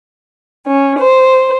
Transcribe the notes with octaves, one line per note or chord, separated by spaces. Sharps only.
C#4
C5